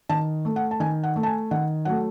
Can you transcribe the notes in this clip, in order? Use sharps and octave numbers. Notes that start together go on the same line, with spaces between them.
D#3 A5
A3
F#5
A5
D#3 G#5
F#5
A3
A5
G#5
D#3 F#5
F#3 A3 F#5